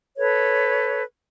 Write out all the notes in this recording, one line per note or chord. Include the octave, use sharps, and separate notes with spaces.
A4 B4 C#5